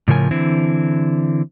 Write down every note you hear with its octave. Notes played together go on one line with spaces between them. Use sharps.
A2 C#3 F3 A#4 G#5
D3 E3 C4 E4